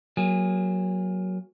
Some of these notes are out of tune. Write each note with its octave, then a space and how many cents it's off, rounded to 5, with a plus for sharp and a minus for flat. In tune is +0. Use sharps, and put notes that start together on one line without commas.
F#3 +0 A#3 +10 G#4 -25